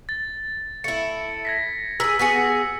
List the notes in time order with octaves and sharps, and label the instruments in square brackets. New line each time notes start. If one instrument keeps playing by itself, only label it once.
[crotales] A6
[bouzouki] A3 E4 [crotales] C#7
[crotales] G#6 A#6 B6
[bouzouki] G#4 A#4 [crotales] E6 B6
[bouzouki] B3 F#4 G#4 [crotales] B6 C#7